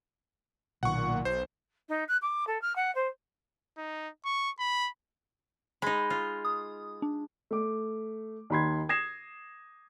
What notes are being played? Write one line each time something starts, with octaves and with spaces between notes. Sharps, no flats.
B1 A#2 D#3 F#5 C#6
B1 C5
D#4
F#6
D6
A4
F6
F#5
C5
D#4
C#6
B5
G#3 D#4 B5
F4
D#6
D4
A3 D6
D#2 D#4 B5 C6 G#6
D#6 G#6 A#6 C7 E7